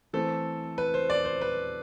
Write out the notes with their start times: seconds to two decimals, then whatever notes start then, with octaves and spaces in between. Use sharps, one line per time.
0.13 E3 A3 C4 A4
0.78 B4
0.94 C5
1.10 D5
1.25 C5
1.41 B4